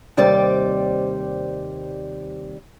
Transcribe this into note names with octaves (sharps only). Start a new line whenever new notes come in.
D#2 C3 G3 C5 D5